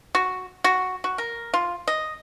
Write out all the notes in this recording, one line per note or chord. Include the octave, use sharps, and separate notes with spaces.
F#4
F#4
F#4
A#4
F4
D#5